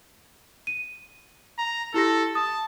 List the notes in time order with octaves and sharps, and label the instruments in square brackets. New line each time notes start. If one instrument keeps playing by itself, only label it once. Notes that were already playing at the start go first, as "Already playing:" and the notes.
[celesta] D#7
[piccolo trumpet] A#5
[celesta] E4 G4 A#6 [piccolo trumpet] A4
[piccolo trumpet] A5 [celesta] D#6